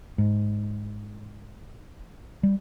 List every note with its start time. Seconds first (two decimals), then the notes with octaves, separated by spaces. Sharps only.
0.18 G#2
2.43 G3